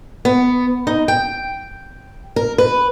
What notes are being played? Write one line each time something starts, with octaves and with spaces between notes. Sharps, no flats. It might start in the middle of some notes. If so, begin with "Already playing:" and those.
B3
D#4
G5
A#4
B4